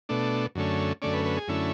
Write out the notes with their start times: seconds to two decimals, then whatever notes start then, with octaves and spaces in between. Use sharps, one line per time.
0.09 B2 A3 D4
0.55 F#2 D3 A3 C#4
1.02 F#2 D3 A3 C#4 D5
1.13 B4
1.25 B4
1.37 G#4
1.48 F#2 D3 A3 C#4 E4